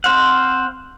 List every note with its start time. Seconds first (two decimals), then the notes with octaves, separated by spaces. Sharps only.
0.04 C4 C5 F5 F#5